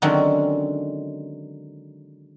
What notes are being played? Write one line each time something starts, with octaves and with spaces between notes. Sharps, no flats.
D3 D#3 F#3 G#3 C4 C#4